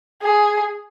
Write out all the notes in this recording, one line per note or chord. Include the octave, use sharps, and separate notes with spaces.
G#4